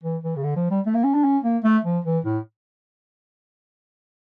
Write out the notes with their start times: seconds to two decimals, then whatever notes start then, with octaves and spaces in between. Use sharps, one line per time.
0.03 E3
0.23 E3
0.36 C#3
0.43 D3
0.56 F3
0.71 G3
0.86 A3
0.94 A#3
1.04 C#4
1.14 D4
1.24 C#4
1.44 A#3
1.64 A3
1.85 F3
2.04 E3
2.24 A2